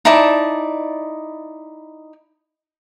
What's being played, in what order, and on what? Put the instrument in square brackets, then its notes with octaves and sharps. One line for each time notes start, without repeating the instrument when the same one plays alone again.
[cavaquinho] D#4 E4 D5 A5